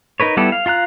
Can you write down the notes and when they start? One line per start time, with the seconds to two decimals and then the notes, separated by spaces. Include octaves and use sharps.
0.20 D#4 A#4 B4 C#5
0.37 G3 B3 E4 G4 A4
0.52 F5
0.66 F4 F5 A#5 F#6